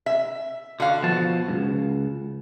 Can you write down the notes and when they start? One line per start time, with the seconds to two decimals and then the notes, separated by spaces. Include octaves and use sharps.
0.06 E5
0.80 D3 F#4 F5
1.03 B2 F3 A5
1.48 C#2 G2